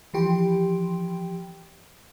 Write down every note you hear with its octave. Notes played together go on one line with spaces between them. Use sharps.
E3 F3 G4 G5 C6